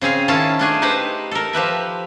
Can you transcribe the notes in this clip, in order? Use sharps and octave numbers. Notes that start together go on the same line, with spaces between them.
C#3 C4 G#4 F5
D#3 C#4 E4 F4 A5
A3 D4 G#4
D#4 G4 B4 C5
A4 A#4
F3 G4 B4 E5